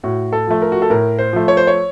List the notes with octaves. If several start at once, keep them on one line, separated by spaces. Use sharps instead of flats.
A2 F#4
A4
F3 A3
A#4
F#4
A4
A2 A#4
C5
F3 A3
C#5
C5
C#5